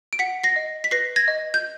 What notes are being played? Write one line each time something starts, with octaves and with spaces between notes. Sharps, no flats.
D7
F#5 B6 C#7
A#6 C7
D#5
B6
B4 A#6 C7
G#6 A#6
D#5
G6